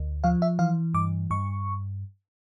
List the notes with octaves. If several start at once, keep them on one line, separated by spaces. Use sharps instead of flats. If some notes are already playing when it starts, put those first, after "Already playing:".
Already playing: D2
F3 F5
E5
E3 F5
G2 D6
G2 C#6